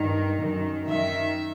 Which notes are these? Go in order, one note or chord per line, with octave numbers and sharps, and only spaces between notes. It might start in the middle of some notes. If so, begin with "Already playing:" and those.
Already playing: G2 D#3
F#2 D#3
F#2 D#3 E5